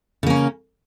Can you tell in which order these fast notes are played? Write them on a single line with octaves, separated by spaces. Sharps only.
C#3 A#3 C#4